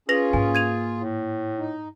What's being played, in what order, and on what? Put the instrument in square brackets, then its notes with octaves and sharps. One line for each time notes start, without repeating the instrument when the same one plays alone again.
[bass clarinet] C#4 [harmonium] F4 G#4 [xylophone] B4 A#6 F7
[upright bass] G#2 A#3 [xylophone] G#5
[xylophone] G#6 D#7 F7
[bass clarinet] A2
[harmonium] D#4